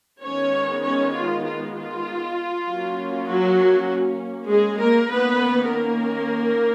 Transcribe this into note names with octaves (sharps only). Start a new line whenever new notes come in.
D#3 G#3 B3 C#4 C#5
C#4 C#5
F4
F4
F4
F#3 A#3 C#4
F#3 F#4
G#3 G#4
A#3 A#4
D#3 A#3 B3 C#4 B4
A#3 A#4